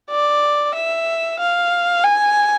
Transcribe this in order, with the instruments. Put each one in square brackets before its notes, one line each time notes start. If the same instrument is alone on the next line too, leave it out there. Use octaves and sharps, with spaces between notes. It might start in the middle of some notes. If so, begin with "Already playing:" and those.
[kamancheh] D5
E5
F5
G#5